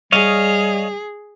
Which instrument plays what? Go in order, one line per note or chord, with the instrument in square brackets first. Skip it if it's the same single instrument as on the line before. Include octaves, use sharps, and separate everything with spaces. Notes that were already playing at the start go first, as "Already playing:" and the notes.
[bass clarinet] G3 [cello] G#4 [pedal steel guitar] C#5 D#5 F5